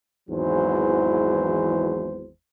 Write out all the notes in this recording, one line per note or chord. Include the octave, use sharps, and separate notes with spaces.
G#1 E2 G#2 E3 F#3 C5